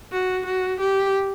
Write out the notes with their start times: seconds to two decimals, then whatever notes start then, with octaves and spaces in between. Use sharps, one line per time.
0.12 F#4
0.46 F#4
0.80 G4